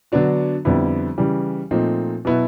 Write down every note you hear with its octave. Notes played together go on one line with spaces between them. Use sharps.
D3 F#3 B3 D4 F#4
F2 D3 G3 B3 E4
C#3 E3 G3
A#2 F3 A3 C4 D#4
B2 F#3 B3 E4